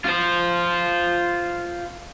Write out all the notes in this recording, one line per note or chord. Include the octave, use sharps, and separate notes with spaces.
F4 C5